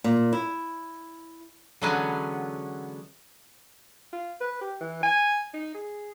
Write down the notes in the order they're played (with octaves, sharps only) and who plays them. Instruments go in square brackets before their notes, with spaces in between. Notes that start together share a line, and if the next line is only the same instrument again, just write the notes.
[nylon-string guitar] A#2
E4
[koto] D3 E3 F#3 G#3 B3 C#4
[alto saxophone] F4
B4
G4
E3
G#5
D#4
G#4